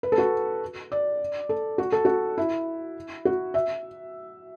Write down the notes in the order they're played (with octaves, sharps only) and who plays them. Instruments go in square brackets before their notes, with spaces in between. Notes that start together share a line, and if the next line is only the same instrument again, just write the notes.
[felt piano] B4
A4
F#4
D5
A4
F#4
A4
F#4
E4
F#4
E5